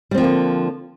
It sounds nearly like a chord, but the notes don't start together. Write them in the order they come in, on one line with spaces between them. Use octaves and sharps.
G3 C4 F3 A#3 D3